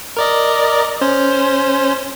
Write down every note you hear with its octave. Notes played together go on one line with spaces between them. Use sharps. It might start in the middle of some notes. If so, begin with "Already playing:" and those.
A#4 D5 D#5
C#4 C5